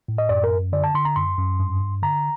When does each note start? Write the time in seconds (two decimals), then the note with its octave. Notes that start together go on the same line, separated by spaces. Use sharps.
0.08 A2
0.18 D#5
0.29 F#2 D5
0.44 A#4
0.51 F#2
0.73 D3 D5
0.84 A5
0.94 D3 C6
1.05 A#5
1.16 F#2 C6
1.38 F#2
1.60 G2
1.80 G2
2.02 D3 A#5